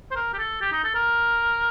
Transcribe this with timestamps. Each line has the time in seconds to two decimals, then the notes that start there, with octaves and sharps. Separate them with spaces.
0.11 C5
0.15 A#4
0.33 G4
0.38 A4
0.61 G4
0.72 D#4
0.84 A4
0.95 A#4